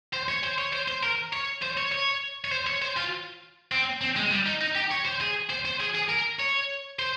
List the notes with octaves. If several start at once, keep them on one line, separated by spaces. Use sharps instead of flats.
C5
C#5
C5
C#5
C5
C5
A#4
C#5
C5
C#5
C#5
C#5
C5
C#5
C5
F4
C4
C4
G#3
G3
D#4
D#4
G4
C#5
C5
G#4
C5
C5
G#4
G#4
A#4
C#5
C5